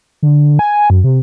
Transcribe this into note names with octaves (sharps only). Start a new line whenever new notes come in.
D3
G#5
F#2
C3